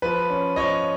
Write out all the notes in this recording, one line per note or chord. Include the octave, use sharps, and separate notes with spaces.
F3 B4
C#4
F3 C#5 D#5